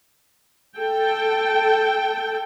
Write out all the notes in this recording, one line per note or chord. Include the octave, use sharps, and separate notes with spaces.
A4 G5